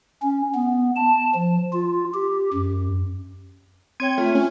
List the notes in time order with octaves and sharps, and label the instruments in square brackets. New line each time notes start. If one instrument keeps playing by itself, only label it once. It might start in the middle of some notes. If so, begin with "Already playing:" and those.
[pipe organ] C#4
B3
A5
F3
F4
G4
F#2
[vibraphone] C4 C#5 G5 [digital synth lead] G#6
[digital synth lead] A3 [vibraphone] F4
[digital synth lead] C#4